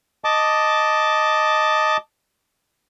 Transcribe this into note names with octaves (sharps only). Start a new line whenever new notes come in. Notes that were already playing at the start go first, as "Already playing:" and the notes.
D#5 A5 D6